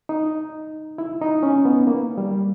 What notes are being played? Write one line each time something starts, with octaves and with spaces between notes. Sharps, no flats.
D#4
E4
D#4
C#4
B3
A#3
G3